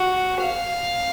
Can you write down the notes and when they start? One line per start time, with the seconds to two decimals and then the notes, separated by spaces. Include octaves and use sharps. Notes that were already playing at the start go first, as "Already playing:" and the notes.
Already playing: F#4
0.41 F5